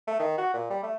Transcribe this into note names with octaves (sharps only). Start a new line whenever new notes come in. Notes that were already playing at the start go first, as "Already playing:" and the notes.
A3
D#3
F#4
A#2
G3
A3